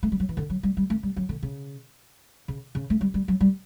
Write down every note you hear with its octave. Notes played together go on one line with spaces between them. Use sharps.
A3
G3
F#3
E3
D3
F#3
G3
G3
A3
G3
F#3
D3
C#3
C#3
C#3
A3
G3
G3
F#3
G3